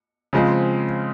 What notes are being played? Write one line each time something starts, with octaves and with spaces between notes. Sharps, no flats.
C#3 F3 G#3 C4